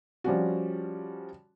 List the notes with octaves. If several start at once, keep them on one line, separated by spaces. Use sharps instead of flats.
F3 G3 C#4 F#4